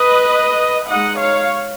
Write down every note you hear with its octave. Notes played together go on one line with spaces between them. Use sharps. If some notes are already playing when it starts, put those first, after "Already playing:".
Already playing: B4 D#5
G#3 D#4 D#5 F#5
C#5 F5